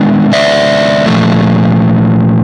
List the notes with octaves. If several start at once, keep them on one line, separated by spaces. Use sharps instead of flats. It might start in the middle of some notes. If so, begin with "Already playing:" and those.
Already playing: D#3 G#3 B3 D4
D5 E5
A#2 F3 A3